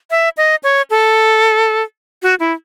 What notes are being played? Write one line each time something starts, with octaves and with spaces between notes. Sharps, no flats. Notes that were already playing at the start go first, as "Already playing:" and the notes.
E5
D#5
C#5
A4
F#4
E4